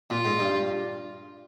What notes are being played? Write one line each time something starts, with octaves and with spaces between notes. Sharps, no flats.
A#2 F4
G#2
G2